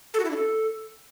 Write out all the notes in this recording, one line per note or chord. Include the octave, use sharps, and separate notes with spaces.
A4
F#4
E4
D4
A4